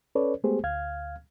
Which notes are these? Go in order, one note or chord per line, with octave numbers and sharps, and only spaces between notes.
C#4 A4 B4 C#5 D5
G#3 A3 B3 G4 G#4 C5
D2 F5 F6 G#6